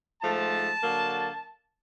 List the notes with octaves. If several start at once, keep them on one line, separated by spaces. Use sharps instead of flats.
G#2 F3 A3 A5
D3 F#3 A#3